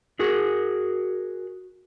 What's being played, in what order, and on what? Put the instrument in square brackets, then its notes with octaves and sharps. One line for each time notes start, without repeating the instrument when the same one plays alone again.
[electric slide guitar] F#4 G#4 A#4